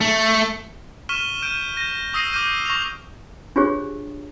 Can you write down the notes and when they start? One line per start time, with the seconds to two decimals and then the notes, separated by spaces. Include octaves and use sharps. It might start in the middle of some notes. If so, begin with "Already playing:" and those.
0.01 A3
1.09 C#6 F6 B6 D#7 E7 G7
1.42 F6 G6 D7 D#7
1.77 G6 A#6 D#7
2.14 C#6 D#6 E6 A#6 C7 D#7
2.33 D6 F6 G6 D#7
2.65 C#6 A#6 C7 F7
3.56 D4 F4 G4 G#4 C5 C#5